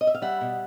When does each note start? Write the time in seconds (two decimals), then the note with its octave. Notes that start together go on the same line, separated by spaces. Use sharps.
0.01 D#5
0.07 E5
0.15 F5
0.22 G3 E5 F#5
0.41 B2